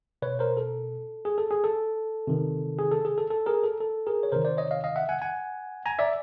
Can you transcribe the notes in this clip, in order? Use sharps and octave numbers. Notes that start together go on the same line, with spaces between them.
B2 B4 C#5
A#4 C5
A4
G#4
A4
G#4
A4
C3 D#3
G#4
A4
G#4
A4
A4
G#4 A#4
A4
A4
G#4 A#4
C#5
C3 D#3 A#4 C5
C5 D5
C#5 D#5
D#5 F5
D#5 F5
E5 F#5
F#5 G#5
F#5 G#5
G#5 A#5
D5 E5